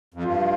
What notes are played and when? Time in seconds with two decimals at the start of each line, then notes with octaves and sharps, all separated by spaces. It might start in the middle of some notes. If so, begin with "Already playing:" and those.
0.14 F2
0.24 G2 F4